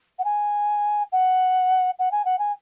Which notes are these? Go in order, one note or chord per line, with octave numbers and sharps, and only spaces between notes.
F#5
G#5
F#5
F#5
G#5
F#5
G#5